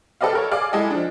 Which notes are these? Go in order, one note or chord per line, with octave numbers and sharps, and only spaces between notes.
A4 B4 D5 D#5 F5
A4 A#4 C#5
G#4 D5 F5 D6
G#3 E4 G#4 A4 D#5
F3 D4